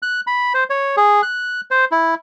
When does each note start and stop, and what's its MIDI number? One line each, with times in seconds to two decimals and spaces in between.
0.02 0.21 90
0.27 0.53 83
0.54 0.64 72
0.70 0.96 73
0.97 1.22 68
1.23 1.61 90
1.71 1.85 72
1.92 2.15 64